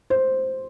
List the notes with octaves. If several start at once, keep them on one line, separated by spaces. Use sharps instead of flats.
C5